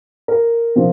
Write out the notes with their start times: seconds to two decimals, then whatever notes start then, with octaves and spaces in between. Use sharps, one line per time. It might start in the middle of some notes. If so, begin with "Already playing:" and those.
0.28 A#4
0.76 C3 F3